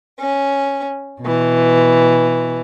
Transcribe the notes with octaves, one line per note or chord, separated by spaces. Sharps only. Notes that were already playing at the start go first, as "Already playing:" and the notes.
C#4
B2 E3